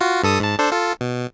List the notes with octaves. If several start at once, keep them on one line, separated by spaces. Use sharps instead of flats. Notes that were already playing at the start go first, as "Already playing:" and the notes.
F4 F#4
G2 A4 D#6
G#2 A5
D4 A4 C5
F4 A4
B2